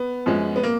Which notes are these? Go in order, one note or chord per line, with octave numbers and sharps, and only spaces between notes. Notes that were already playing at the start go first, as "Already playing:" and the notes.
Already playing: B3
F#2 F3 G#3
B3
A#3